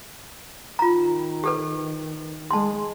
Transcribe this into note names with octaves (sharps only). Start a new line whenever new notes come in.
D#3 F4 A#5
G4 A4 B4
G#3 A5 C6